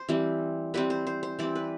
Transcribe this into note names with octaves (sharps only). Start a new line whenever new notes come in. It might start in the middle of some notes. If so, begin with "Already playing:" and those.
Already playing: C5
E3 G3 C4
E3 G3 C4 B4
C5
C5
C5
E3 G3 C4 D5
B4